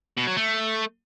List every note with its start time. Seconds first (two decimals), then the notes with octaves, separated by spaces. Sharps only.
0.17 B2
0.27 F#3
0.36 A3